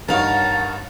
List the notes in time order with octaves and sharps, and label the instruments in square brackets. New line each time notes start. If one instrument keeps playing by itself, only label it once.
[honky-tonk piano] G2 D#4 C#5 [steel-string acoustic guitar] A#4 F5 [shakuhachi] F#5 [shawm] A5